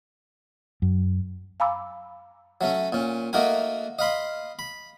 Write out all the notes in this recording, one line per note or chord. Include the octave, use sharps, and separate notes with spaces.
F#2
F5 G#5 A#5 B5 D6 E6
F#3 A3 C#4
A#2 C#4
A3 A#3 D#4 F#4 A#4 G#5
D#5 F5 B5 C6
B5